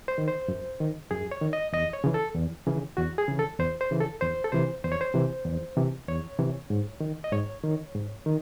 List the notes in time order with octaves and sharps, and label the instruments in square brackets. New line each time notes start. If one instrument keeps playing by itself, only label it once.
[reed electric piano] C5
D#3
C5
F#2
D#3
F#2 G#4
C#5
D#3
D#5
E2 D#5
C#5
C#3 E3
A4
E2
C#3 E3
E2 F#4
G#4
C#3 E3
A4
E2 C5
C5
C#3 E3
A4
E2 C5
A4
C3 E3 C5
E2 C5
C#5
C5
C3 E3
E2
C3 E3
E2 C#5
C3 E3
G#2
D#3
D#5
G#2 C#5
D#3
G#2
D#3